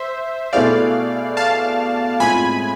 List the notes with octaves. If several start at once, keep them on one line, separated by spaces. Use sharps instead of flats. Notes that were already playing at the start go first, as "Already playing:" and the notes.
Already playing: C5 E5
B2 A3 E4 G#4 C5 D5 F5
F5 A5
A2 G#3 C4 F4 G#4 G#5 B5